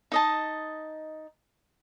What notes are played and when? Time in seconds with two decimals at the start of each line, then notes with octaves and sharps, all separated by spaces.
0.12 D#4 D#5 A5